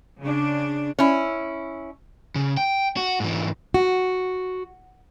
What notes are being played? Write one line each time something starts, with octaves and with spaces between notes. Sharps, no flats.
C#3 D4
C#4 E4
C#3
G5
F#4
G#2 E3
F#4